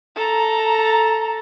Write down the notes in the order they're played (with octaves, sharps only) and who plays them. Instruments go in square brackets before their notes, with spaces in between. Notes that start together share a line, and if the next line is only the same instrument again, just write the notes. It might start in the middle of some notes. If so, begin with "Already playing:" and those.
[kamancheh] A4 A#5